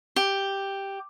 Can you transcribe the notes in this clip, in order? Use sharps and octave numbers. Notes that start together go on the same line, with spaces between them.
G4